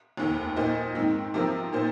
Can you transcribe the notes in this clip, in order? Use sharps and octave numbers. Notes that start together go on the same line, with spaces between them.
F1 D#2 D#3
A#2 A#3 D#4 C5 D#5
G#2 D#3 C4 D#4
C3 F3 C4 D#4 A#4
A#2 A#3 D#4 C5